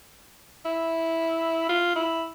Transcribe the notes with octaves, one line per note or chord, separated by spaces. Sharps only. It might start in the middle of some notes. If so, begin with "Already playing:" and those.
E4
F4
E4